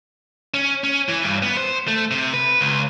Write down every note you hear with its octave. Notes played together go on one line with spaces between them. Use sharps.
C#4
C#4
E3
G2
B3
C5
A3
C3
B4
C#2